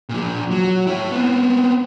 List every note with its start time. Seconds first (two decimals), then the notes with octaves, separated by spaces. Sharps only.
0.09 A#2 F3
0.51 F#3
0.87 E4 C#5
1.11 B3 C4